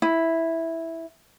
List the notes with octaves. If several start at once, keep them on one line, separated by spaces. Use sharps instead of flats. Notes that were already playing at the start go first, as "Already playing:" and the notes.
E4